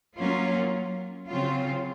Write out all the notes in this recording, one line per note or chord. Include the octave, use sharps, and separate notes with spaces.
F#3 A#3 C#4 F4
C#3 F#3 C4 F4